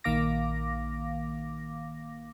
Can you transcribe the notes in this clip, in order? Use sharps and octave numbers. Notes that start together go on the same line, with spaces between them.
A#1 D#3 A#3 F5 D6 A#6